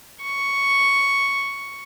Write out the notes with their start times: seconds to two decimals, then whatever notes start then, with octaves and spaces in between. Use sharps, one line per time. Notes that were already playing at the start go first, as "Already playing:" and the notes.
0.22 C#6